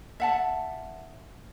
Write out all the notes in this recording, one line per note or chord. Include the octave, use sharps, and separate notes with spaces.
E5 F#5 A5